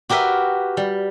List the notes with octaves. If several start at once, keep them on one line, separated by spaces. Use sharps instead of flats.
F#4 G4 A#4 B4 E5
G3